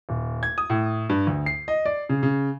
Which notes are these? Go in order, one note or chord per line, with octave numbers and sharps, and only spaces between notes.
D#1
G#6
D#6
A2
G2
D2
C7
D#5
D5
C#3
C#3